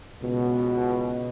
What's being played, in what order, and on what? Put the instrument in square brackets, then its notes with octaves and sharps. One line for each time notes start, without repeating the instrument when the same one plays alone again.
[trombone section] C#2 B2